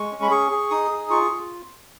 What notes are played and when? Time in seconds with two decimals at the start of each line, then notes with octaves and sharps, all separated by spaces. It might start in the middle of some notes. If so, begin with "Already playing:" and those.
Already playing: G#3 C#6
0.12 C#4
0.22 B5
0.31 G#4 C#6
0.51 G#4
0.70 D#4 D#6
0.91 G#4
1.10 F4 C#6
1.31 F4